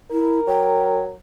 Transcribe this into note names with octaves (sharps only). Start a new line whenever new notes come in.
E4 A#4
F#3 G5